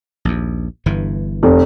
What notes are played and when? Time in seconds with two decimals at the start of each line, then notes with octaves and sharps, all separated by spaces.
0.25 A#1 D#2
0.86 G1 G2 E3
1.43 F1